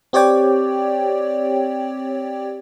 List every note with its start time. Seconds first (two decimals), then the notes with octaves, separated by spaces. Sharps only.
0.13 C4 G4 C#5 D5 G5